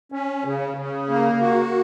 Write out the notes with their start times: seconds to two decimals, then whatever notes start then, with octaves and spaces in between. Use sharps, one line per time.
0.12 C#4
0.44 C#3
0.77 C#3
1.09 A#3
1.41 F#4